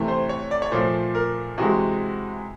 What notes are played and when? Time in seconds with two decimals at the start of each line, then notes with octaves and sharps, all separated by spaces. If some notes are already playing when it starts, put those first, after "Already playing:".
Already playing: C3 E3 A3
0.08 C5
0.29 C#5
0.51 D5
0.62 C#5
0.72 A#2 F3 A3 C5
1.15 A#4
1.58 C3 E3 G#3 F#4